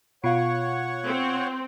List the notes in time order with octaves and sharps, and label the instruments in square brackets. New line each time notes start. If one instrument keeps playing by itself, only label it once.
[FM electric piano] B2 [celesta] F4 F5 [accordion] C#5 F#5 C#6
[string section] C4